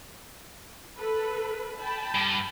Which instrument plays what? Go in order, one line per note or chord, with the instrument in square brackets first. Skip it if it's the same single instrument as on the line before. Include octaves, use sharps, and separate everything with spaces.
[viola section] A4 B4
G5 A5 B5
[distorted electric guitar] G2